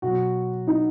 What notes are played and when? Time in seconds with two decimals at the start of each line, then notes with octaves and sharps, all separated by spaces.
0.02 B2 F#3 F#4
0.67 D#4